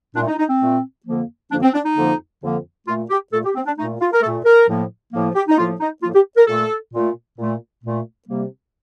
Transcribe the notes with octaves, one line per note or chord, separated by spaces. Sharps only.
A#2 D4
A3
D#4
D#4
C4
A#2 A3
F2 D3 F3 A#3
F2 D3 F3 A#3 D4
C4
D4
D#4
F2 D3 F3 A#3
F2 D3 F3 A#3
A#2 A3 F4
G4
A#2 A3 A4
G4
C4
D4
A#2 A3 D#4
F4
A#4
A#2 A3 A4
A#4
A2 F3 A#3
A2 F3 A#3
G4
D#4
A2 F3 A#3 F4
D#4
A2 F3 A#3 F4
G4
A#4
A#2 A3 A4
A#2 A3
A#2 A3
A#2 A3
C3 G3 A#3